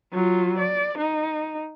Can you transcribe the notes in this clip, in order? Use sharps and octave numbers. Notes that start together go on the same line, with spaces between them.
F#3 F4
D5
D#4